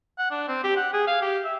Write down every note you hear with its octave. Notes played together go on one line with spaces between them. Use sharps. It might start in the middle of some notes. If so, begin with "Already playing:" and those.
F#5
D4
C4
G4
F#5
G#4
F5
G4
E5